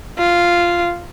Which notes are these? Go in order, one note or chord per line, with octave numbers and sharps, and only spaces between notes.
F4